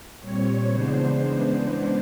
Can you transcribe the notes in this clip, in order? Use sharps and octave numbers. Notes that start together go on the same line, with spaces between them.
A#2 G3 C4 C#5
C#3 E3 G#3 B3 D4 C5